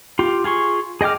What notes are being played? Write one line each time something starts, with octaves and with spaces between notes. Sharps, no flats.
F4 G4
F4 G#4 C6 C#6
G#4 D#5 G5 D6 F6